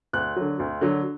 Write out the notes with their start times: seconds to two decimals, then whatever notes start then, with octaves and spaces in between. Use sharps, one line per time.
0.13 D2 F#6
0.36 D3 F#3
0.59 D2
0.81 D3 F#3